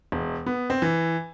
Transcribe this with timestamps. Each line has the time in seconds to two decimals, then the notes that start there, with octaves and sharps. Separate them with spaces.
0.12 E1
0.46 B3
0.70 C4
0.82 E3